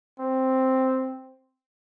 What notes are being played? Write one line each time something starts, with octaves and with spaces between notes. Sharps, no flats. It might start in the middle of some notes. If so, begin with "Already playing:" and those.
C4